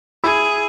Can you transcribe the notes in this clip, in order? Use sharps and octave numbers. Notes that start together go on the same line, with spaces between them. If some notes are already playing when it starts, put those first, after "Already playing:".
E4 G#4